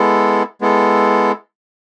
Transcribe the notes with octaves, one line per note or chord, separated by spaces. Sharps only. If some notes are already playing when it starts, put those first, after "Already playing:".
Already playing: G#3 B3 E4 A4
G#3 B3 E4 A4